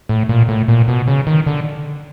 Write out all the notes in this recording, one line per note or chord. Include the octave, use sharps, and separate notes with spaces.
A2
A#2
A2
A#2
B2
C#3
D#3
D3